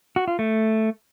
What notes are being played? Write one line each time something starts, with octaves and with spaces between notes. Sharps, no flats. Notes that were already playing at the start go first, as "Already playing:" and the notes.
F#4
F4
A3